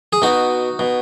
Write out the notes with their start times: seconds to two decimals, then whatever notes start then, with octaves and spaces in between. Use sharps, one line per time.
0.13 G#4
0.22 B2 D#4 F#4
0.79 B2